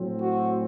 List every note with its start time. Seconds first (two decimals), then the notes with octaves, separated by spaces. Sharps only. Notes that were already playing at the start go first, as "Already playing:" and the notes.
Already playing: A2 F#3 C4
0.21 F#4